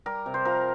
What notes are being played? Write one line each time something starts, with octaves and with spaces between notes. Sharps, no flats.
G3 A#4
C3
C5
F3 A#4